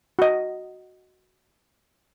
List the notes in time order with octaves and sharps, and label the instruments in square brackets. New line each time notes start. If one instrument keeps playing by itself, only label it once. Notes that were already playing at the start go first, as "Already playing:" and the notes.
[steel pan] F#4 D#5